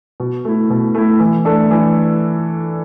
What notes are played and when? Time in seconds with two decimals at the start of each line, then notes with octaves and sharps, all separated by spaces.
0.20 B2
0.45 A3 E4
0.70 B2
0.95 A3 E4
1.20 E3
1.45 A3 D4 A4
1.71 E3